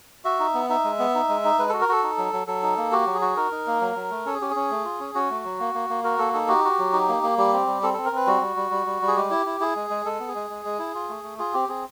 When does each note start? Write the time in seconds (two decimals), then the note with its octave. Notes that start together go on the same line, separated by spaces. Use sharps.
0.25 F#4 E5
0.40 D#4
0.54 B3
0.69 D#4 E5
0.84 G#3
0.99 B3
1.15 D#4
1.29 G#3
1.44 D#4
1.58 G#3 B4
1.69 F#4 A4
1.81 A#4
1.89 F#4 A4
2.03 D#4
2.18 F#3
2.33 F#3
2.47 F#3 A4
2.63 D#4
2.77 A#3
2.92 F#4 G4
3.07 F#3
3.14 G#4
3.21 F#4
3.37 D#4 A#4
3.51 D#4
3.67 A#3
3.81 F#3
3.96 F#3
4.11 A3
4.25 C#4 A4
4.34 G#4
4.41 C#4 G4
4.51 G#4
4.56 C#4
4.71 A3
4.85 F4
5.00 C#4
5.15 C#4 F#4
5.30 A3
5.44 F#3
5.60 A#3
5.74 A#3
5.89 A#3
6.04 F#4 A#4
6.19 A#3 A4
6.33 D#4 A4
6.48 F#4 G4
6.64 F#4
6.79 F#3
6.93 D#4
7.08 A#3
7.23 A#3
7.38 G3 G4
7.53 C4
7.67 G3
7.83 C4 A4
7.94 C4 A4
8.05 A#4
8.12 C4 B4
8.27 G3 F#4
8.41 G3
8.56 G3
8.71 G3
8.87 G3
9.02 G3
9.08 G#4
9.16 G#3 G4
9.30 E4
9.46 E4
9.60 E4 G#4
9.76 G#3
9.90 G#3
10.06 G#3 A4
10.20 B3
10.28 G#4
10.35 G#3
10.50 G#3
10.65 G#3
10.79 E4
10.95 F4
11.09 A3
11.24 A3
11.39 F4 G#4
11.53 C4 G4
11.68 C4 G#4